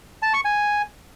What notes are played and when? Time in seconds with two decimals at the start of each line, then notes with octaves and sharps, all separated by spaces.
0.22 A5
0.34 C#6
0.45 G#5